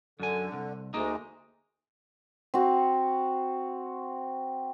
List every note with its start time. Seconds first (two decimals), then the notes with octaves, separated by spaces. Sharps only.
0.20 F#2 D3 G#5
0.52 C2
0.94 D2 G#3 A#3 D#4
2.54 C4 F#4